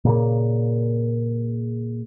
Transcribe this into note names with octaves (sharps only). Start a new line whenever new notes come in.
A#2 C#3 A#3